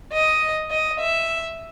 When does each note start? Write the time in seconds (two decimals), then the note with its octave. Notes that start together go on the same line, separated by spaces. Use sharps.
0.12 D#5
0.71 D#5
1.00 E5